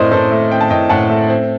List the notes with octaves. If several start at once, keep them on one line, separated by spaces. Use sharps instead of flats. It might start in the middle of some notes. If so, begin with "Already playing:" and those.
Already playing: A2 C4 A#4 C5 D5 D#5
A2 A4 C5
A3
C4 G5
A5
A2 D#5 G5
A2 F#5 A5
A3
C4